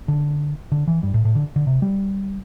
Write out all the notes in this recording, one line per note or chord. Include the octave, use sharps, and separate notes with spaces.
D3
D3
E3
G2
A2
A2
D3
D3
C3
G3